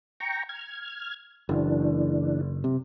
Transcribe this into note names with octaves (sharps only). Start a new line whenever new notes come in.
G5 A#5 C#6
F6 G#6
F#1 E3 D4
C3